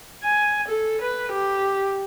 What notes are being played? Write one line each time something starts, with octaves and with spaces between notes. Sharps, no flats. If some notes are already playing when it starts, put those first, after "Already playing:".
G#5
A4
B4
G4